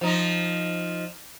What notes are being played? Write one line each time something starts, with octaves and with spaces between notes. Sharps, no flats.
F3 D#4